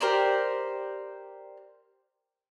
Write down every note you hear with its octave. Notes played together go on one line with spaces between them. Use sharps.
G4 A#4 C5 D5